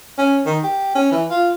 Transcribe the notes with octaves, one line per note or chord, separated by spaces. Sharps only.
C#4
D#3
G4
C#4
E3
F4